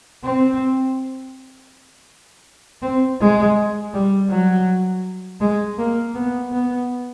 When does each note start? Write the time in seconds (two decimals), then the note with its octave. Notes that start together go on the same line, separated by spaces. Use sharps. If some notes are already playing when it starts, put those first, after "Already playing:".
0.23 C4
2.82 C4
3.20 G#3
3.93 G3
4.30 F#3
5.41 G#3
5.78 A#3
6.14 B3
6.52 B3